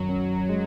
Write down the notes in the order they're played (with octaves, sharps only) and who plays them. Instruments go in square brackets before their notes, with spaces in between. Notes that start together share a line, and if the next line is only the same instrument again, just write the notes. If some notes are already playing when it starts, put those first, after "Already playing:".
Already playing: [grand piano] F#2 D#3 [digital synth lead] F#3
[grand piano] C#4
G#3